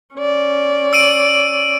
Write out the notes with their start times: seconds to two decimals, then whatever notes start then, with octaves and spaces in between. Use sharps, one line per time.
0.15 C#4 D5
0.93 E6 D7 D#7